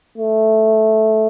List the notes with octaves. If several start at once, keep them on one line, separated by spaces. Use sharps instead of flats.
A3